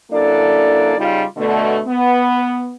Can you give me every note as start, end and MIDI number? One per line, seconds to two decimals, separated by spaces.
0.12 0.97 42
0.12 0.97 58
0.12 0.97 62
0.12 0.97 64
0.12 0.97 69
0.12 0.97 74
0.98 1.24 49
0.98 1.24 55
0.98 1.24 63
0.98 1.24 65
1.37 1.80 47
1.37 1.80 50
1.37 1.80 57
1.87 2.75 59